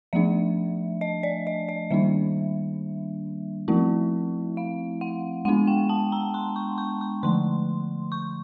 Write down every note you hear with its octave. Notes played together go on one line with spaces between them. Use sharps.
F3 A3 D4 E5
D#5
D5
D#5
D#5
D#3 G3 A#3 D4 E5
F3 A3 C4 E4
F5
F#5
G#3 B3 D4 F#5
G5
A5
A#5
C6
C#6
C#6
C#6
D3 F3 A3 C6
C#6